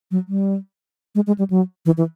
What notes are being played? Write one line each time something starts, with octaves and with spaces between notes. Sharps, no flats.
F#3
G3
G#3
G#3
G3
F#3
E3
E3